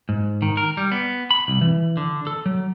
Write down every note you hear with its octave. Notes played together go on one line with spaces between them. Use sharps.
G#2
D#3
A#4
G3
B3
B5
C2
E3
D3
A4
F#3